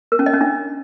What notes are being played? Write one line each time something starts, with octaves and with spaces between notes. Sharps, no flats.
A#4
C#4
D#5
C#4
D4